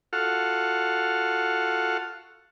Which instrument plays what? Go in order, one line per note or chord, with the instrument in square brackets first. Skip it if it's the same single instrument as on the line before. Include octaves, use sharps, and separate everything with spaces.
[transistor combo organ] F4 F#4 A4 F#5 F6